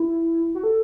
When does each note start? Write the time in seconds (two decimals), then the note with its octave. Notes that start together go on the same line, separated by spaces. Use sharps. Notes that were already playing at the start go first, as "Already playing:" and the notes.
Already playing: E4
0.55 F#4
0.63 A4